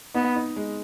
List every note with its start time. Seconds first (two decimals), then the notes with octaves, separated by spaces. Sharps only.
0.14 B3 D#4
0.36 D#4
0.56 G#3